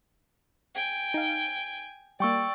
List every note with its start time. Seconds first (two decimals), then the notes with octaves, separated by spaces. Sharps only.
0.75 G5 G#5
1.14 D#4 F5
2.20 G3 A#3 D5 G5 C#6 E6